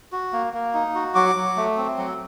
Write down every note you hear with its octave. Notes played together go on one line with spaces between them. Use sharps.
F#4
A#3
A#3
D#4
F#4
F#3 D6
F#3
A3
C4
F#3